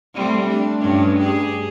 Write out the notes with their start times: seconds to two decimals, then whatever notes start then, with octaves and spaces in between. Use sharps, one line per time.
0.14 G3 A3 C4
0.48 D4
0.81 G2 C#4 D4
1.20 G4 G#4